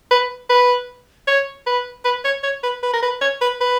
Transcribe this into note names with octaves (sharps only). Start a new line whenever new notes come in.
B4
B4
C#5
B4
B4
C#5
C#5
B4
B4
A#4
B4
C#5
B4
B4